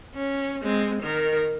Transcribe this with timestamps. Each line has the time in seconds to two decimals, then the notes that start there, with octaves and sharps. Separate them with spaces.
0.14 C#4
0.62 G#3 C4
1.02 D#3 A#4